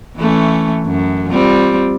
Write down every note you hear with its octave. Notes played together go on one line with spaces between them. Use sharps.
E3 A3 C#4
F#2
G3 C4 F4